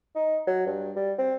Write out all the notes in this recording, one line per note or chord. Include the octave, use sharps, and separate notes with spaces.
D#4
F#3
G2
G3
C4